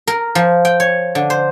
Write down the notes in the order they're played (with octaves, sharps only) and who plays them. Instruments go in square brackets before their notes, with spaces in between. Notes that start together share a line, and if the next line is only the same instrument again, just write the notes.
[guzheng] A#4
F3
G5
C#5
D3
C5